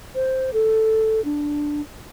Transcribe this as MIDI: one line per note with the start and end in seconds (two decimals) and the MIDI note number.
0.15 0.53 72
0.53 1.23 69
1.25 1.81 62